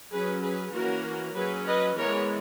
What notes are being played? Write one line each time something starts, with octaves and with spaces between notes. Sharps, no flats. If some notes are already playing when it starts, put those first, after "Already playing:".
F#3 C#4 G#4 B4
G#4 B4
E3 A#3 C#4 F#4 A#4
F#3 C#4 G#4 B4
B4 D#5
E3 G#3 B3 A#4 C#5